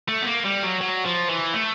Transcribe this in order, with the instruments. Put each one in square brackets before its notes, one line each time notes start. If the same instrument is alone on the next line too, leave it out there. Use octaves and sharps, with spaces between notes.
[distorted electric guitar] A3
B3
A#3
G3
F#3
F#3
F3
E3
A3